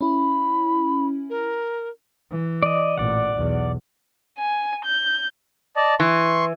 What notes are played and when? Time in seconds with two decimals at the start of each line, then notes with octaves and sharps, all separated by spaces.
0.01 C#4 E4 B5
1.30 A#4
2.30 E3
2.63 D5 D#5
2.98 A1 A#2 D5 F#5
3.33 B1 E2
4.38 G#5
4.85 G6
5.76 D5 D#5 A5
6.00 E3 C6 C#6